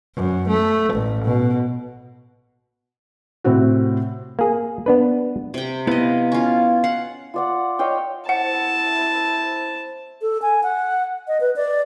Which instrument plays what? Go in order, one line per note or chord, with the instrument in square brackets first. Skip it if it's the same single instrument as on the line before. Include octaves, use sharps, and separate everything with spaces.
[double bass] F#2
A3
A1
B2
[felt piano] A2 C3 C4 F#4
[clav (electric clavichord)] A#3 G#4
B3 D4 B4
[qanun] C3 G5
[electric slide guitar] B3 E4 B4 [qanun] D#5 F5
[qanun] C#4 F4
[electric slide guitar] F5 [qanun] F#5
[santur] F4 D5 F#5
C#5 D#5 F5 G5
[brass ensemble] E4 C5 [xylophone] F#5 [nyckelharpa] A5
[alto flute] A4
G#5
F#5
D#5
B4
D5